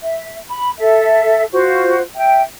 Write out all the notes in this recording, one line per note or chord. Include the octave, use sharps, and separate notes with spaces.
E5
B5
A4 E5
F4 F#4 C5
E5 G5